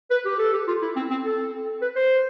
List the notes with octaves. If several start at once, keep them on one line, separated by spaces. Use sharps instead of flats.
B4
G4
A4
G4
F4
E4
C4
C4
A4
B4
C5